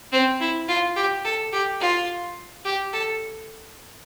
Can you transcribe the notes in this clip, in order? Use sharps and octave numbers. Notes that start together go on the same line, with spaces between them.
C4
E4
F4
G4
A4
G4
F4
G4
A4